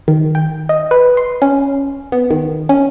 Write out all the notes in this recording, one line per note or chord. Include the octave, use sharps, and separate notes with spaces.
D#3
G5
D#5
B4
C6
C#4
B3
D#3
C#4